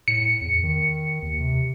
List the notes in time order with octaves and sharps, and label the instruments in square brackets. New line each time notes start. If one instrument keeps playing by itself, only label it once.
[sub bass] A2 [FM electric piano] C#7
[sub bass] E2
D#3
D#2
C3